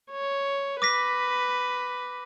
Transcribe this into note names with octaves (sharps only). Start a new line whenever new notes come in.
C#5
B4 D6 A#6 B6